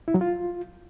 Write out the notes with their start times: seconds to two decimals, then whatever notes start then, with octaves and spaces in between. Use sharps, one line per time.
0.08 E4
0.14 F#3
0.21 F4